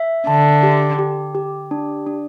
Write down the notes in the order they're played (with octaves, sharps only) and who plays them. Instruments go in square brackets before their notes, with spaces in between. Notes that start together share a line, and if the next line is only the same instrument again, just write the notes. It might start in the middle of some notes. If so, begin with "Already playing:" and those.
Already playing: [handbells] E5
[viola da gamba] D3 [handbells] A5
[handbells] G4
G4
G4
D4
D4